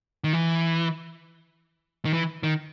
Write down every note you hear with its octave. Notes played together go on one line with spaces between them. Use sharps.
D#3
E3
D#3
E3
D#3